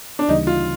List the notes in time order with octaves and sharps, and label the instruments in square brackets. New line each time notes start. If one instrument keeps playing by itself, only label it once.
[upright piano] D4
[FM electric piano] D2 C#3 E3 G3 A#3 [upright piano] D#4
[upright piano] F4